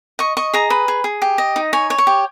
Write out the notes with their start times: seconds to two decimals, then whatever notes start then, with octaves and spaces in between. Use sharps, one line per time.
0.19 D#5 C#6
0.37 D#5 C#6
0.54 G#4 A#5
0.70 B4
0.88 G#4
1.04 G#4
1.22 G4
1.38 D#5
1.56 D#4
1.73 C#5 G#5
1.90 C#5
1.98 C#6
2.07 G4